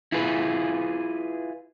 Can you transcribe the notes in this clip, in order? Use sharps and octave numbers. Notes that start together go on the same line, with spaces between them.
E4 F4 G#4 B4